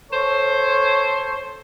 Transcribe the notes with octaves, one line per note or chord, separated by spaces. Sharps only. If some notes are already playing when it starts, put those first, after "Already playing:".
A4 C5 C#5